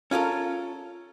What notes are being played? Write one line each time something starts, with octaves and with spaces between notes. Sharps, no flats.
C#4 F4 G4 A4 A#4